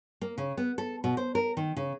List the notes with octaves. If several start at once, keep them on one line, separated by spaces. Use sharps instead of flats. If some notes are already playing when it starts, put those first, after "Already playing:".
A#3
C#3
B3
A4
B2
C5
A#4
D#3
C#3